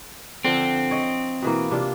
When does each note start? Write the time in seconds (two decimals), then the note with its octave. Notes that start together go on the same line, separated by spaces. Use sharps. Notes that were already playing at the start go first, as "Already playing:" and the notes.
0.45 D3 F3 C4
0.91 C#5 D#5
1.42 B2 E3 A#3
1.71 C3 D4 F4